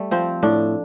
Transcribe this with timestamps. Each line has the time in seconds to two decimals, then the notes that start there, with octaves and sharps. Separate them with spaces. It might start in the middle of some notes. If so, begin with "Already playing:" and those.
Already playing: G3 A3
0.11 F3 C4
0.43 A2 D4